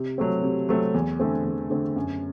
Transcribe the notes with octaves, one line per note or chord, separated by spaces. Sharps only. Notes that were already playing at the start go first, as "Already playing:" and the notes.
Already playing: C3
F#3 A3 C4
C3
F#3 A3 C4
E2
D3 A3 C4
E2
D3 A3 C4
F#2